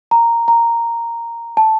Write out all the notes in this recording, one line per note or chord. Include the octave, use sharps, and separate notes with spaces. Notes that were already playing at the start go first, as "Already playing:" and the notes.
A#5
A#5
A5